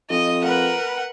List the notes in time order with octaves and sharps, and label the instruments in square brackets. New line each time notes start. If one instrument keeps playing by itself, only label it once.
[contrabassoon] F2 [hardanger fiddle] D#5
[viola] A#4 B4 [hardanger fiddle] F#5